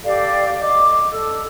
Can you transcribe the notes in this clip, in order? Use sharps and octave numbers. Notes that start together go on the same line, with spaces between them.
G4 A4 D5 F5
D#5 D6
A4 E6